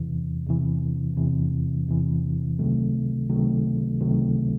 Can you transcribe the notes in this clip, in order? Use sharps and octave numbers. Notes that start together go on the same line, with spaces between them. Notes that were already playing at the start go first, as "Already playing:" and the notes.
Already playing: E2 C3 E3
E2 C3 E3
E2 C3 E3
E2 C3 E3
C#2 C3 D#3 F#3 A3
C#2 C3 D#3 F#3 A3
C#2 C3 D#3 F#3 A3